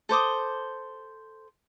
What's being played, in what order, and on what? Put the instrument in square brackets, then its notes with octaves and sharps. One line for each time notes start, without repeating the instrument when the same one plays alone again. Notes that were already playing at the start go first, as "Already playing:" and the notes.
[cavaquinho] A4 C5 D6 D#6